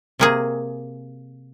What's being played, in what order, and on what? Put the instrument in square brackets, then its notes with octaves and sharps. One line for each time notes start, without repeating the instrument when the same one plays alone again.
[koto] C3 A#3 G#4